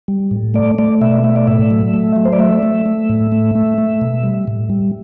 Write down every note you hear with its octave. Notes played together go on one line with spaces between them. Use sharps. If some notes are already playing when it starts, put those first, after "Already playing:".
G3
A2
A3 D5
A3 D5
B2 E5
A3 E5
D5
A2 E5
F#3
A3
F#3
C5
D5
A3 E5
A3
A3
A2
A3
A3
A3
B2
G3
A2
G3